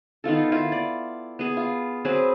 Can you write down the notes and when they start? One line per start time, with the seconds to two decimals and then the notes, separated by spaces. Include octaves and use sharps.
0.24 D#3 B3 F4 A4
0.52 E4 F4
0.72 D5
1.39 B3 G#4
1.57 F4
2.05 F#3 C4 G#4 B4